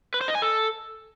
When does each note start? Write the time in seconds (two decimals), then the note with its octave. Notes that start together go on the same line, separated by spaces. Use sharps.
0.14 B4
0.21 C5
0.28 D#5
0.35 G#5
0.42 A4